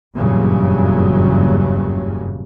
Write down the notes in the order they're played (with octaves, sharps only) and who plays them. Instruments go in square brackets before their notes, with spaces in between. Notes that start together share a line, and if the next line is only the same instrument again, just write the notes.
[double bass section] F#1 E2 G2 A#2 C#3 F#3